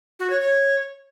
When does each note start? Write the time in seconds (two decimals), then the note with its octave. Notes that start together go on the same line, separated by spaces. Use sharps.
0.20 F#4
0.30 C#5
0.41 C#5